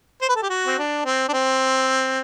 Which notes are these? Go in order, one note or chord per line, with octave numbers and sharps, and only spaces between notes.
C5
B4
A4
G4
F#4
C4
D4
C4
D4
C4